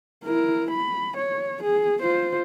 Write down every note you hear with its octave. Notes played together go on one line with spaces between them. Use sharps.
E4 A#4
B5
C#5
G#4
F4 C5